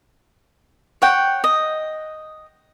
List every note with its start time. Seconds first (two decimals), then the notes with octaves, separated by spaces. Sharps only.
1.02 C#5 F#5 G5
1.44 D#5